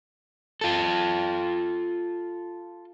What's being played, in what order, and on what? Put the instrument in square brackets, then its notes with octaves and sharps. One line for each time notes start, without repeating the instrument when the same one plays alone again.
[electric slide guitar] F4 A4